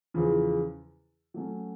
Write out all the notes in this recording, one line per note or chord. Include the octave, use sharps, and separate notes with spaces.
E2 C#3 F3
F#3 A3 C#4